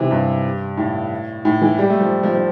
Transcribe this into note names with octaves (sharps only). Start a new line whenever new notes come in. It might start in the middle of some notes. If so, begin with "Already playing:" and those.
Already playing: C3 E3
G2
A2
A2
E3
G3
A3
F3
F3
F3